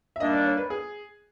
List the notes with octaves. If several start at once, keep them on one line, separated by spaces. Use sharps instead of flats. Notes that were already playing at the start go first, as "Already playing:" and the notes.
E5
D#3 G3 A#3 D4 D#5
D5
C#5
B4
G#4